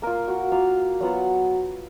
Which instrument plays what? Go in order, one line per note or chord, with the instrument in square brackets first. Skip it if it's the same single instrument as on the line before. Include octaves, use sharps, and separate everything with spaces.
[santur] A#3 F4 A#4
F#4
A#3 F4 F5
F#3 B3 F4 F#5